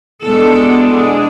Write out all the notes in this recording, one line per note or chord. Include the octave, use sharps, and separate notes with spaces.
E2 B2 G#3 B3 D4 A4
G#4